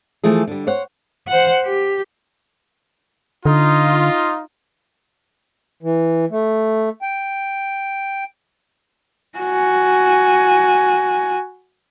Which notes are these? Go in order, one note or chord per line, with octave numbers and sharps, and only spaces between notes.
E3 F3 A3 G#4
D3 G3
C5 C#5 F#5
C5 F#5
G4
D3 D#4 F4
E3
A3
G5
F#4 G#5